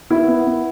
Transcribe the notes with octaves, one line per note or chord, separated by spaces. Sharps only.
B3 E4
B3
B3